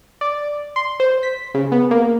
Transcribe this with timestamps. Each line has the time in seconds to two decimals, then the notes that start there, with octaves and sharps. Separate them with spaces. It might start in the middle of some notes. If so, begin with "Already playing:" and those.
0.21 D5
0.76 C6
1.00 C5
1.23 B6
1.54 C#3
1.72 B3
1.91 A#3